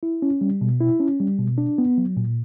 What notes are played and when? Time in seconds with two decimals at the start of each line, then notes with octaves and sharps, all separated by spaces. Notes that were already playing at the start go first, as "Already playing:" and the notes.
0.03 E4
0.22 C#4
0.41 G3
0.61 B2
0.80 E4
1.00 C#4
1.20 G3
1.39 B2
1.58 D4
1.78 B3
1.98 F#3
2.17 A#2